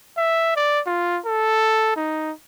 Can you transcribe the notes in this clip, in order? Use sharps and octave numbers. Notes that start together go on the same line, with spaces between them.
E5
D5
F4
A4
D#4